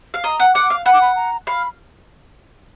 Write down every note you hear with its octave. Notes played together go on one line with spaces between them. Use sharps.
F5
D#5 A#5
F#5
F#5 D6
F5
F#5 B5
D6
B5
A#5
F5 B5